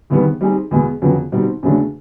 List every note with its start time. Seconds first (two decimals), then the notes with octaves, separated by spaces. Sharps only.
0.10 E2 C3 D#3 G3 B3
0.41 G3 C4 D#4 G#4
0.71 E2 B2 G#3 B3
1.02 F2 C#3 F#3 B3
1.32 B2 G3 C4 D#4
1.63 E2 C#3 F#3 A3 D4